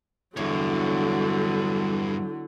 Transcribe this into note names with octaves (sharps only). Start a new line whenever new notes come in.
E2 G2 D3 F#3 C#5